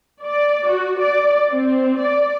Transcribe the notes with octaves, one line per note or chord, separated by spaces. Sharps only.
D5
F#4
D5
C4
D5